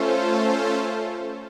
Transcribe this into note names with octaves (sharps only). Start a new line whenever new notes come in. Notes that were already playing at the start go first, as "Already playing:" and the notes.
Already playing: A3 C#4 F4 A4 C5